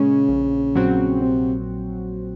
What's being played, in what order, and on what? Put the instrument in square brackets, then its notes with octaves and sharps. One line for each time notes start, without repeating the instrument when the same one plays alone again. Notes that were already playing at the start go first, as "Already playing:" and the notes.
Already playing: [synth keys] A#2 G#3 C#4 [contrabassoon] C#3
[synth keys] A#1
A#2 F#3 C4 F#4
[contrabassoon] C3